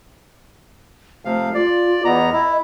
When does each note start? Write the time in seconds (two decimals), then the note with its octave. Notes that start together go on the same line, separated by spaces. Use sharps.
1.25 C3 F3 A3 F5
1.54 F4 D5
2.05 E2 B3 D#5 A#5
2.33 E4